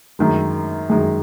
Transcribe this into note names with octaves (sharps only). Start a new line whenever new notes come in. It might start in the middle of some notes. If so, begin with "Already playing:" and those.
F#2 D#3 G#3
F#2 D#3 G#3